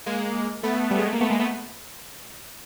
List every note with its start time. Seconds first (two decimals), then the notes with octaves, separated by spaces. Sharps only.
0.06 G#3 A#3
0.63 A3 B3
0.91 G3
0.98 G#3
1.05 A3
1.13 A#3
1.21 A3 B3
1.30 G#3 A#3
1.39 A3 B3